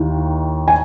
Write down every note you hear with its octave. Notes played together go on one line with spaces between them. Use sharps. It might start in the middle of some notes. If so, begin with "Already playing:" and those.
Already playing: D#2 D#3 E4
G#5